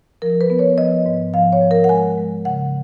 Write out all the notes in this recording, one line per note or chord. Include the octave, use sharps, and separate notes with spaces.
F3 A#4
B4
B3
C#5
F3 D#5
G#2
F3 F5
C#5
F3
A#4
F#5
G#3 G#5
G#3
C#3 F#5